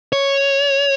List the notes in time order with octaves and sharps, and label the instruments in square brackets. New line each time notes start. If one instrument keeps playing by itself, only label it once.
[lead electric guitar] C#5